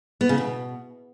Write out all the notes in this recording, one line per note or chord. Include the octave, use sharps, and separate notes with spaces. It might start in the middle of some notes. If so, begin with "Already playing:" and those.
B3
C#3
B2